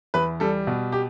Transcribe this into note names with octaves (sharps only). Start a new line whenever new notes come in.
E2 B4
G3 A4
B2
G4